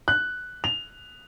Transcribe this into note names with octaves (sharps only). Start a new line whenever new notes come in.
F#6
F7